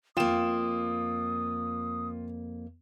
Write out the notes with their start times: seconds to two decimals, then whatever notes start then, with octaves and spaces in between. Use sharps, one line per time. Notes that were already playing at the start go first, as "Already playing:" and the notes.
0.17 F2 A#3 F4 G5 D#6 E7